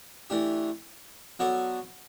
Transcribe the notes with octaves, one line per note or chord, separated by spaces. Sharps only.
E3 A3 D4 G4
F#3 B3 F#4 A4 D5